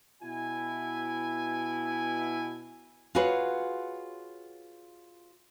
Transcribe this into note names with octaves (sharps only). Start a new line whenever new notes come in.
B2 E4 G#5
F4 F#4 G#4 B4 C#5 F#5